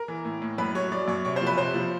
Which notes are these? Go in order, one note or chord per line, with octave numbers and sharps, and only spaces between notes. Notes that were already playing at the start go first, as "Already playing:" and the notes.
Already playing: A#4
E3
A2
A2
F#2 B4
F#3 C#5
F#3 D5
F#2 C#5
C3 C#5
C5
F3
B4
C3 C5
F3